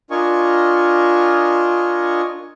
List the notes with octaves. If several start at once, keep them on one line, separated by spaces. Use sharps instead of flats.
D4 F4 A#4 D#5 G#5 C#6